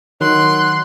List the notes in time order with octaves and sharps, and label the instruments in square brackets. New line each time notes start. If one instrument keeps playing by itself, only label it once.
[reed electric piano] D#3 [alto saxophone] F#3 [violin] C6 [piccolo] F#6